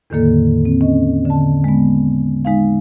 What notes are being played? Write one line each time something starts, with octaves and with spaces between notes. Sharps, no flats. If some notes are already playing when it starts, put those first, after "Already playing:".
E2 A2 D3 D#3 A#3 A4
C4
C#4 D#5
D3 A5
G#3 B3
G#3 D#4 F5